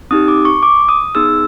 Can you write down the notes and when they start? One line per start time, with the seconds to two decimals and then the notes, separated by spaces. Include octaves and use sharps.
0.11 C4 D#4 G4 D#6
0.28 D6
0.45 C#6
0.63 D6
0.89 D#6
1.15 B3 D#4 G#4 E6